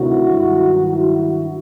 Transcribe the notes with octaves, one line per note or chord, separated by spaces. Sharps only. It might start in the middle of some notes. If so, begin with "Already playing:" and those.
Already playing: D2 C3 D#3 F#3 E4 F#4
G2 D#3 F#3
E4 F#4